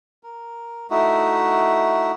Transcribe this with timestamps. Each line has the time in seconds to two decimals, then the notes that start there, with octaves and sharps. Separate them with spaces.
0.23 A#4
0.90 A3 D#4 E4 F#4